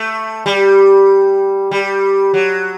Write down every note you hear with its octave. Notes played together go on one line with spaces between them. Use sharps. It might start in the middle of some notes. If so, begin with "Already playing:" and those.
Already playing: A3
G3
G3
F#3